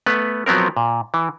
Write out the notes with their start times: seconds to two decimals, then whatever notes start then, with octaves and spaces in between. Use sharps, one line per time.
0.06 A3 B3 B4
0.46 F3 F#3 B3 C4 A#4
0.77 A#2
1.14 E3